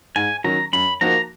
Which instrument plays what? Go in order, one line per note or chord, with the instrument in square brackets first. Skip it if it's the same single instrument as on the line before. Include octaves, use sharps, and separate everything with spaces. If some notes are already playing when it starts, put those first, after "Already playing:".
[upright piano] G#2 [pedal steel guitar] G#5
[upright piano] D#3 F#3 C#4 [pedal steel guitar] A#5
[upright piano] F#2 [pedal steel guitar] B5
[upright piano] F3 A#3 D#4 F#4 [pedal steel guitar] A#5